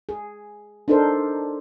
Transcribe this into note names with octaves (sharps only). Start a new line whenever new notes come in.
G#4
D4 D#4 A4 A#4 C5